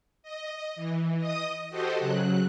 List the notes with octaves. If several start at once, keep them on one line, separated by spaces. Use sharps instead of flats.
D#5
E3
D#5 D#6
F#4 G4 A4 C5 D#5
C#3 F#3 F#6